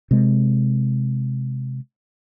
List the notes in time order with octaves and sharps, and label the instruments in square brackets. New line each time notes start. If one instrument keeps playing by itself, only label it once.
[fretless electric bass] C3 G#3